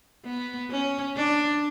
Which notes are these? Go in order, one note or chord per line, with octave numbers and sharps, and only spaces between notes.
B3
C#4
D4